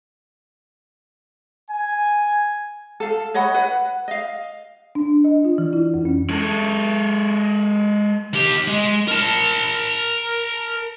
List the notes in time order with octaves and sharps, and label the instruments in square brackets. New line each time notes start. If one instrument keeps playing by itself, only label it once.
[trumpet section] G#5
[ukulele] A4 F5
C#5 D#5 F#5 B5
B4 F#5
D#5 F5
[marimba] D4
D#5
F4
E3
E4
F2
C#4
[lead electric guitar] G#3 A4
D#2 G4
G#3
A#4 A5